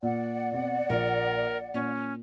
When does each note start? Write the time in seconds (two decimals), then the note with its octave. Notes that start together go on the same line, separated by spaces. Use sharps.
0.03 A#2 D5 F#5
0.52 B2 C4
0.89 A#1 A#4
1.74 A#2 C#4